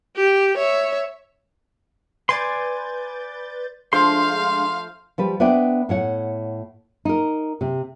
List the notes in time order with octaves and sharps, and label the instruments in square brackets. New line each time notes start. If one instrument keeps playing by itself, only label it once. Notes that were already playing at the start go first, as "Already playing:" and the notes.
[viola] G4
C#5 E5
[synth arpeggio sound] B4 G6 A6 [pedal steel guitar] D5 G#5 C6
[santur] F3 A3 C5 [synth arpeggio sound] G#3 D4 G#4 [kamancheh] F5 [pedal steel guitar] C6
[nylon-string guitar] F3 G3 B4
B3 D4 C5 D5 E5 G5
A2 C#5 F#5
D#4 A#4
C3